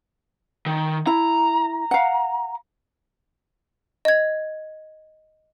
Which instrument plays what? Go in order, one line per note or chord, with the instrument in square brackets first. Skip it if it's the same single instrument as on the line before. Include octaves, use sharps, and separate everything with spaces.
[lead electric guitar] D#3
[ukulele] E4 [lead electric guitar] A#5
[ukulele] F5 F#5
[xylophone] D#5 G#6